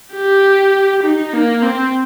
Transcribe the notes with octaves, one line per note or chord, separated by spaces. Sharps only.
G4
D#4
A#3
C4